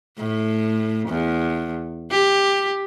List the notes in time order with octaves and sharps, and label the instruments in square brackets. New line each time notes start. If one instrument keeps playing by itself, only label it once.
[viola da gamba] A2
E2
G4